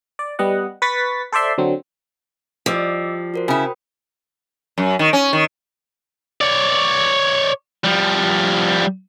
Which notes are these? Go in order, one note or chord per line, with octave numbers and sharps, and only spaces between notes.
D5
G3 B3 D#5 F#5
B4 C#6 A6 B6
A4 C5 D5 E5 C6
D3 F#3 C4
F3 G3 D#5 D6 E6
F#4 A#4 C5
C#3 E4 G5 B5 D#6
F#2
D#3
C#4
D#3
C#5 D5
F3 G3